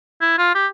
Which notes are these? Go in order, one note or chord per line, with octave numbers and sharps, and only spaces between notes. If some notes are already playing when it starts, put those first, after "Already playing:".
E4
F4
G4